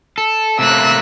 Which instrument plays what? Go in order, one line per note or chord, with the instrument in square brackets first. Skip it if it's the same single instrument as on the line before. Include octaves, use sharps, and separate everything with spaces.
[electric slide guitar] A4
[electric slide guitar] C3 A3 A#3 [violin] E6 F#6